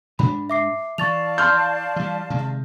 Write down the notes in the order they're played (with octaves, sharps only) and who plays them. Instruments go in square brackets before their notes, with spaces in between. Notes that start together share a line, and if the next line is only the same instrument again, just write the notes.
[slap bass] G#2 G#3 D4 [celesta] B5
[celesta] E5 D6 C7
[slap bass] E3 [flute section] D5 F5 A5 [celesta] C#6 A6 F7
[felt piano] C6 F6 G6
[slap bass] E3 G3
C3 D#3 G#3